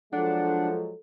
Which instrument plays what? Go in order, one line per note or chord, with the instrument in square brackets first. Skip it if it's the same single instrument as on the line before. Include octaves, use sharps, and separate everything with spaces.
[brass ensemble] F3 F#3 G#3 [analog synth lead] D4 [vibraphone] A4 [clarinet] F#5